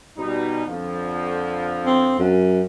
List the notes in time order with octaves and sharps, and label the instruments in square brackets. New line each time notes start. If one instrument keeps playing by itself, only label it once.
[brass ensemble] B2 G3 D#4
F2 D3 F3
[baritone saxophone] C4
F#2